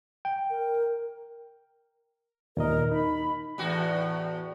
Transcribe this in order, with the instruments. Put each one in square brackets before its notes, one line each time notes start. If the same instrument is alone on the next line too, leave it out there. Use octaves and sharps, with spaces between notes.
[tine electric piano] G5
[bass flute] A#4
[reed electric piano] D#2 A#2 D#5 [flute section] A#4
[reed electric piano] D#4 [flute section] B5
[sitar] E2 A2 F#4